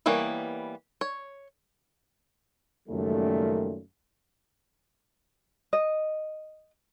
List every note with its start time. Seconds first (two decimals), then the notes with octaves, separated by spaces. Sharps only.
0.06 E3 G3 A#3 B3 C#5
1.01 C#5
2.89 C#2 F#2 A#2 D#3 G3 A3
5.73 D#5